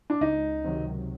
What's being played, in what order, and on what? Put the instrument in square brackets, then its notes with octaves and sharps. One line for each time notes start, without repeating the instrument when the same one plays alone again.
[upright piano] D4
[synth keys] C#2 [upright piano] D#4
[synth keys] C3 D#3 F#3